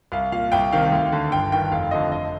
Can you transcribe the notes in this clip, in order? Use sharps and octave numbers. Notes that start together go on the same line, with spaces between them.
C2 F5
A#2 F5
C2 G5
C3 D#3 F5
D2
D3
G1 G5
G2 D#3 G5
F1 F5
F2 D3 D#5
F1 D#5